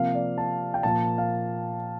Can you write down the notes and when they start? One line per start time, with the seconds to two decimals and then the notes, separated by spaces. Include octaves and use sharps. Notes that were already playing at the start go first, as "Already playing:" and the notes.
Already playing: C3 F3 A#3 F5
0.15 D5
0.38 A5
0.74 G5
0.83 A#2 F3 A#3 A5
1.18 F5